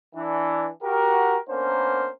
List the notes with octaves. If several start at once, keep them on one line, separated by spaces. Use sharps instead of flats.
E3 D4
F#4 G4 A#4
A#3 B3 C#4 D4 A#4 C5